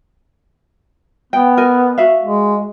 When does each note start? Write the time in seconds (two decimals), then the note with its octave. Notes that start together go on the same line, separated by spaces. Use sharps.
1.33 B3 G5
1.57 A#4 D#5 G#5
1.98 F#4 E5 F5
2.23 G#3